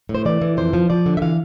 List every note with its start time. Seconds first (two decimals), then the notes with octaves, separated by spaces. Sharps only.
0.09 A2
0.15 C5
0.25 E3 D5
0.42 E3
0.57 F2 C5
0.73 F3
0.90 F3 D5
1.06 D3
1.17 E5
1.22 E3 F5